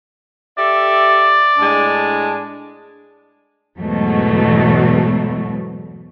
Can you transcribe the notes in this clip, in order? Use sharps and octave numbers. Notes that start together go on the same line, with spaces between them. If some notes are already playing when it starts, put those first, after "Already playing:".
G4 A4 D5 E5
A2 G#3 D4
E2 G#2 B2 F#3 A3